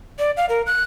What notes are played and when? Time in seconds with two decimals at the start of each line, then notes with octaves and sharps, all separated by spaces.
0.19 D5
0.37 F5
0.49 A#4
0.66 F#6